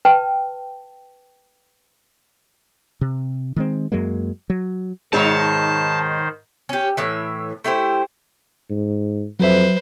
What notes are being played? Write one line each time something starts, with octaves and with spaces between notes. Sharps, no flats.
B4 G5 A5
C3
D#3 G#3 C4
F#2 F#3 G#3 A#3
F#3
G#2 B2 D#3 G#3 D#4 C5 C#5 A5
C#4 G4
A2 E3 E5
A3 E4 G4 C5
G#2
F2 F#3 B4 C5 E5